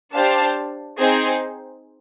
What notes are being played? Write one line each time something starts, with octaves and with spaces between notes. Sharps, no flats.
D4 G4 C5 F5 A5
C4 D#4 G#4 C5